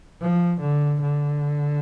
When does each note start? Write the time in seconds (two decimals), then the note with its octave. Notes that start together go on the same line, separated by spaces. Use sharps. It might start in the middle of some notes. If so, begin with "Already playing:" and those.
0.21 F3
0.61 D3
1.02 D3